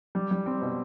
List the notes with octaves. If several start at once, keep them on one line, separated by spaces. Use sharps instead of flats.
G3
G3
C4
B2